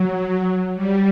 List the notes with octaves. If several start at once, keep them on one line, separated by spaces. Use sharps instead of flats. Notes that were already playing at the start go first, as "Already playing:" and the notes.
Already playing: F#3
G3